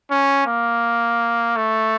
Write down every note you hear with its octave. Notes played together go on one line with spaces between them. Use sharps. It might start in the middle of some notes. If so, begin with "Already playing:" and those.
C#4
A#3
A3